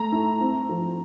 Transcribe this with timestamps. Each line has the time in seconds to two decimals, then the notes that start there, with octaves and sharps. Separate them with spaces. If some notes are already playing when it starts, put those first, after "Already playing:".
Already playing: A3 A#5
0.12 E4
0.41 C4
0.69 F3